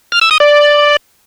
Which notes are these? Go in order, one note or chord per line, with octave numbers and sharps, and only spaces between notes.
F6
E6
D#6
D5